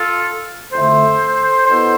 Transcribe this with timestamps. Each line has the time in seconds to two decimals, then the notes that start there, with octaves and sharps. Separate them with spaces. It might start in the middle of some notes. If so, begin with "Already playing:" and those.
Already playing: F4 A4
0.72 F2 D3 A3 E4 A4 C5
1.66 B2 B3 E4 A4 C5